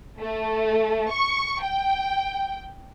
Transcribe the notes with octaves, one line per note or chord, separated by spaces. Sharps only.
A3
C#6
G5